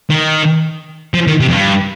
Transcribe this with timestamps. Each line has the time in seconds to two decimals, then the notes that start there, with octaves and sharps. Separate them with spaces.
0.10 D#3
1.14 F3
1.27 D#3
1.41 C3
1.49 F2
1.53 G2